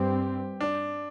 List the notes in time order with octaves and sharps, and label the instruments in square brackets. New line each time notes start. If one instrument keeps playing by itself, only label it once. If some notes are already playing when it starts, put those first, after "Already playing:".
Already playing: [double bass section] G2 G3 C4 [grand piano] G4
[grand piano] D4